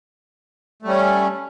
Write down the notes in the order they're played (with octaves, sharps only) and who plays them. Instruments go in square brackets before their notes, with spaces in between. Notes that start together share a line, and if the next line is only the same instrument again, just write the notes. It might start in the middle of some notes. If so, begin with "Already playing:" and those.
[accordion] A3
G3
C#4